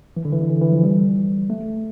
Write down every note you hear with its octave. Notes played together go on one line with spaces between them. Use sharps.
E3
D3
E3
D3
E3
E3
F3
G3
A3